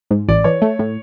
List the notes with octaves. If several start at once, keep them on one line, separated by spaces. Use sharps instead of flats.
G#2
A1 D5
E3 C#5
A3
A2